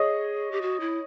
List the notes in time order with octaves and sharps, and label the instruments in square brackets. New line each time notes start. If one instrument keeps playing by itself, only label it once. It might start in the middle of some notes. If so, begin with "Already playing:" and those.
Already playing: [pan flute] G#4 [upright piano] C#5 D#5
[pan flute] G4
F#4
E4